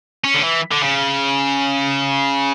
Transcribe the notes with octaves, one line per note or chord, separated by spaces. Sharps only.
C#4
D3
E3
D3
C#3